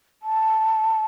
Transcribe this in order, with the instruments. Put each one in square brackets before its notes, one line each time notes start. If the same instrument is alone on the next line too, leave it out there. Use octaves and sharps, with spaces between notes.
[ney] A5